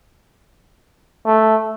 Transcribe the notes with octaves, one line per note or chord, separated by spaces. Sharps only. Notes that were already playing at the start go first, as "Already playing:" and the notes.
A3